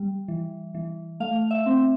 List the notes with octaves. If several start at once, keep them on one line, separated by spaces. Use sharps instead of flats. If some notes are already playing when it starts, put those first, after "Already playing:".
Already playing: G3
E3
E3
A3 F5
E5
C4